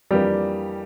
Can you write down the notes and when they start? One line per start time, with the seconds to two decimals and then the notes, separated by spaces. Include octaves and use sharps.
0.11 F2 E3 G3 A#3 D4 G4